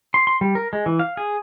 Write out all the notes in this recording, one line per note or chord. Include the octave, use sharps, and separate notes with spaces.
C6
C6
G3
A#4
G#3
E3
F5
G#4